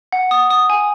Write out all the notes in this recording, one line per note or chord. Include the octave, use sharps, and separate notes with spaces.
F#5
D#6
D#6
G#5